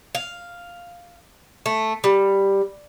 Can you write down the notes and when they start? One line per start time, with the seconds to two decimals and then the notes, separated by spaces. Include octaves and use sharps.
0.15 F5
1.66 A3
2.04 G3